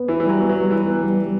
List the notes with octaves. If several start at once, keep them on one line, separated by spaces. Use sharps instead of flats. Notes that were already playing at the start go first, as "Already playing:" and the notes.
Already playing: B3
E3 E4
E3
F#3 G3
B3
F#3
G3
E3 E4
B3
G3
G3